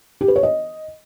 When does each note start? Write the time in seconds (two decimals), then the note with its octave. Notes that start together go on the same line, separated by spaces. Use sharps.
0.21 G4
0.28 B4
0.36 C#5
0.43 D#5